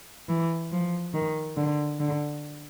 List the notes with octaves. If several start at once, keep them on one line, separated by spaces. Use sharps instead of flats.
E3
F3
D#3
D3
D3